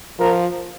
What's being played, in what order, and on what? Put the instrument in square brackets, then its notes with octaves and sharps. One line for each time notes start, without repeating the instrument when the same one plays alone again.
[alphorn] F3 [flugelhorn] A#4